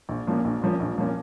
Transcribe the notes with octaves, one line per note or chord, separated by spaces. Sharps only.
A#1
A#2 F3 A#3 C#4
A#1
A#2 F3 A#3 C#4
A#1
A#2 F3 A#3 C#4